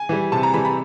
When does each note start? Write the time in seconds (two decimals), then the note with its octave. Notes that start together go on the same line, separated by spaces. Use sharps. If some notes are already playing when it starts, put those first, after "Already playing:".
Already playing: G#5
0.09 E3 G3
0.32 C3 A5
0.43 A#5
0.54 E3 G3 B5
0.65 B5